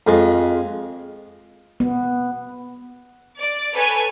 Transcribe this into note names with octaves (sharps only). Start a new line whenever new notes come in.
F2 G#3
B3
D5
A4 B4 C#5 G#5